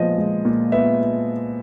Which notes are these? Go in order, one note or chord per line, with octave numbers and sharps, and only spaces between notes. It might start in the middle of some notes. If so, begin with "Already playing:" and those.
Already playing: A#2 F3 G#3 B3 D#5
G#3
A#2
B3 E5